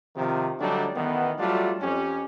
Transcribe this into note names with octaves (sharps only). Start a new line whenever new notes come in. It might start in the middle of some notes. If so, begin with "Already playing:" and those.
C3 D#3 F3
D3 F#3 G3 A3 D4 D#4
A1 D#3 E3 B3
F#3 G3 A3 D4 F4
F2 C#4 G4